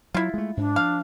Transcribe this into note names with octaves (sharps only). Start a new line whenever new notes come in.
F#3 E4 F4
G#3 A3
G#2 D4
F3 F5